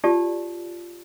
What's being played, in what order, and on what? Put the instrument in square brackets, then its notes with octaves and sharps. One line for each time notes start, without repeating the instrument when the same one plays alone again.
[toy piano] F4 G4 D5 A5